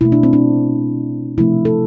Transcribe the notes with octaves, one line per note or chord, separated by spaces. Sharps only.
B2 A3 E4
D4
C4
D4
C3 F3 A3 E4
A4